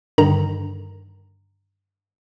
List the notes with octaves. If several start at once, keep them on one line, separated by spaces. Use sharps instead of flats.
G2 D3 D#3 A#5